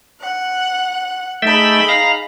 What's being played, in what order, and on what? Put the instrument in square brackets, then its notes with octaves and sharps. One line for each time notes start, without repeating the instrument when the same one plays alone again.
[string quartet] F#5
[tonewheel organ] A3 E5 G5 [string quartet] D#4 G#4 B5
[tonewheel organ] F5 A#5